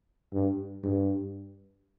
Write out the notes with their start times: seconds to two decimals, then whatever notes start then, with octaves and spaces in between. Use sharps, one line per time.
0.33 G2
0.84 G2